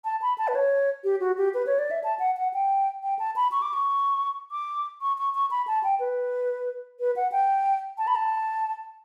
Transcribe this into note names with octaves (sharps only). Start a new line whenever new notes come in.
A5
B5
A5
B4
C#5
G4
F#4
G4
B4
C#5
D5
E5
A5
F#5
F#5
G5
G5
A5
B5
C#6
D6
C#6
D6
C#6
C#6
C#6
B5
A5
G5
B4
B4
F#5
G5
A5
B5
A5